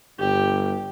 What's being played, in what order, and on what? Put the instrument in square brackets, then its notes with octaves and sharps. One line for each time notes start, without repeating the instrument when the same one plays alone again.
[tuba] G1 [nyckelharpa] G4